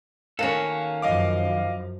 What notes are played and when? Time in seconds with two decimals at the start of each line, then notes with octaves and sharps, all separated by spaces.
0.39 D#3 A#3 C#4 F#4 A4 F5
1.02 F#2 F3 D#5 F5 D6